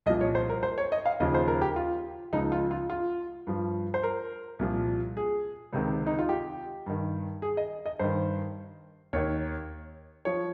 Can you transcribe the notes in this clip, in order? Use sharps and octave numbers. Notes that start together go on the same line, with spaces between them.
C2 A#2 F3 D#5
C#5
C5
A#4
C5
C#5
D#5
F5
D#2 C#3 F3 D#5
C5
A#4
G4
F4
C#2 C#3 F3 D#4
F4
F4
F4
G2 F3
C5
A#4
C2 A#2 F3
G#4
C#2 C3 D#3
D#4
F4
G4
G2 D#3
G#4
D#5
D#5
G2 D#3 C5
D#2 D#3 C#5
F3 C#5